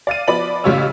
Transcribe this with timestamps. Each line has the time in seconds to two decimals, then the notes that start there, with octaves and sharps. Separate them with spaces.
0.07 D5 F5 A6 D#7
0.27 F3 B3 D5 D#5 B5 F#7
0.64 A1 C#3 G3 F4 C#5 E6